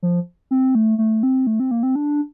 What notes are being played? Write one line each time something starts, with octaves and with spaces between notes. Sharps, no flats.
F3
C4
A3
A3
C4
A3
C4
A#3
C4
D4